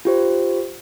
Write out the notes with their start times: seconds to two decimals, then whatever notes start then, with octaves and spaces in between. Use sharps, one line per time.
0.05 F4 G4 C5